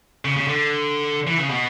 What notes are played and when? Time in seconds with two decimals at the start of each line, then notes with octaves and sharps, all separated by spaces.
0.25 C#3
0.37 C#3
0.48 D3
1.27 E3
1.38 C#3
1.49 B2